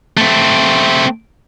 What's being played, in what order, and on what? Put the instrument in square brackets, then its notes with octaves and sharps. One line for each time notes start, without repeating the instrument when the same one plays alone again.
[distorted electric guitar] A3 C4